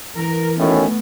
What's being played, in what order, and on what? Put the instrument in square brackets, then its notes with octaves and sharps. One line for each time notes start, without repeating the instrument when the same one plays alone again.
[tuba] E3 [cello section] A#4
[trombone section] F#2 A2 D#3 [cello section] A3 B3 [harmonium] C#4